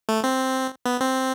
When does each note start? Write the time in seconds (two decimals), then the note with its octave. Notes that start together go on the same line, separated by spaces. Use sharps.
0.09 A3
0.24 C4
0.86 B3
1.01 C4